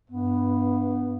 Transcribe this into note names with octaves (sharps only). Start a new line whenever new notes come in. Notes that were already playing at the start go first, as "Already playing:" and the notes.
G2 B3